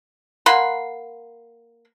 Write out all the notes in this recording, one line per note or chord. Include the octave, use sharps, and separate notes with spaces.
A#3 F#5 B5 C6